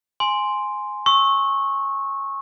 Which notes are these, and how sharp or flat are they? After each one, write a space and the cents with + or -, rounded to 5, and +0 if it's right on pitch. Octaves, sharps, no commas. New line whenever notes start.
G#5 +0 C6 +0
C#6 -15 E6 -25